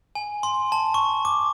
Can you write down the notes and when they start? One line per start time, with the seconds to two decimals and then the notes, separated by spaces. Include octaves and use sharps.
0.15 G#5
0.43 C6
0.72 A5
0.94 C#6
1.25 D6